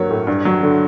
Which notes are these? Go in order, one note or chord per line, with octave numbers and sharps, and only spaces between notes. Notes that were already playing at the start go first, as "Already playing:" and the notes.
Already playing: G2 F#3 A#3 C#5
A2
G2
F#3
D3